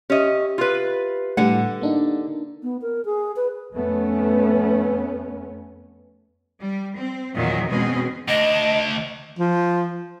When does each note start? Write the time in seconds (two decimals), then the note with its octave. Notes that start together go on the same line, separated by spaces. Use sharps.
0.10 C#4 G4 D#5 E5
0.58 F4 B4
1.37 A2 D3 G3 F#5
1.81 A#3 D4 D#4
2.63 B3
2.82 A#4
3.05 G#4
3.36 B4
3.74 F2 A3 B3 C#4
6.60 G3
6.97 C4
7.36 E2 A#2 D#3 E3 F#3
7.69 B2 G#3 C4 C#4 G#4
8.28 D2 D4 D#5
9.39 F3